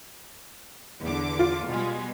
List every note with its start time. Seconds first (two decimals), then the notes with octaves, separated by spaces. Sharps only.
1.04 E2 D3 D6
1.39 F4
1.70 B2 G3 G#3